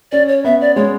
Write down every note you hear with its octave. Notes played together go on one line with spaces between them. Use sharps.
C#4 D5
C#5
B3 E5
D5
G#3 C#5